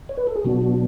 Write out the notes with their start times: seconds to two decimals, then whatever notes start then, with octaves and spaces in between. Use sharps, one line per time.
0.09 C#5
0.17 B4
0.27 A4
0.36 G#4
0.44 B2 F#3 B3 D4 F#4
0.62 F#4